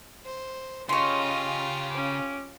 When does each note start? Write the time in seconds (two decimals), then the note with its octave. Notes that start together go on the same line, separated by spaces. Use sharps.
0.25 C5
0.89 C#3 C#4 F4 G4 C#5 D#5 C6
1.91 C#4 D6